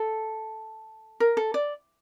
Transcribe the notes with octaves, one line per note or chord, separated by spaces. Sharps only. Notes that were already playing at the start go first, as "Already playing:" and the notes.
Already playing: A4
A#4
A4
D5